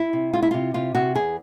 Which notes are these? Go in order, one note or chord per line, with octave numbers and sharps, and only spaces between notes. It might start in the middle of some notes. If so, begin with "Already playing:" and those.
Already playing: E4
C3
G#3 F4
E4
C3 F4
C3 F4
C3 F#4
E2 G#4